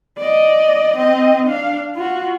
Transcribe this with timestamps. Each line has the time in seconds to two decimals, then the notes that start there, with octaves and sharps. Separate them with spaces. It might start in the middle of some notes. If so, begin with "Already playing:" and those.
0.18 D5 D#5
0.97 C4 D#5
1.47 D4 F5
1.95 F4 F#4